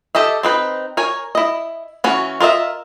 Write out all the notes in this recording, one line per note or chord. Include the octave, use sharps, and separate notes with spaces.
G4 A4 D#5 E5
C4 D#4 B4
A#4 C#5 G#5
E4 D#5
E3 C#4 F#4
F4 A#4 D#5 E5